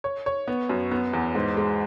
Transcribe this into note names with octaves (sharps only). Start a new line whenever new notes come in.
C#5
C#5
B3
F#2
B3
E2
G#2
G#3